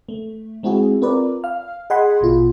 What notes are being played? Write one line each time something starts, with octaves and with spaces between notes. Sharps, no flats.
A3
G#3 C4 E4 F#4 G#4
C4 F4 A#4 B4 D5
F5 F6
G#4 D#5 F#5 G#5 B5 C6
A#1 B2 F4